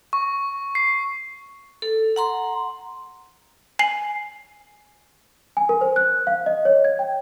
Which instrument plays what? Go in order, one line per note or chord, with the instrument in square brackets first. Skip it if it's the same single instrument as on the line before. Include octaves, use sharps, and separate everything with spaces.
[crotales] C#6
C7
[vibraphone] A4
F#5 A#5 C6
[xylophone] G#5 C7 F#7
[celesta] G#5
A#4
C5
F#6
F5
D#5
C#5
G#6
G5